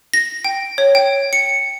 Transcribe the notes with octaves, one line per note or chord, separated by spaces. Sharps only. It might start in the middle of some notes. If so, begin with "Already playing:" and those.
A#6
G5
C#5
G5
C#7